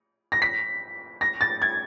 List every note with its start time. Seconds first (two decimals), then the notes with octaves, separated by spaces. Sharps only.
0.32 A#6
0.42 B6
1.21 A#6
1.41 A6
1.62 G#6